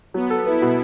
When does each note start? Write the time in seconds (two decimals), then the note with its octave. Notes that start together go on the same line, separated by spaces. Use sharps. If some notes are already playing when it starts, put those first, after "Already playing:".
0.14 F#3 B3
0.30 A4
0.46 B3 E4
0.62 B2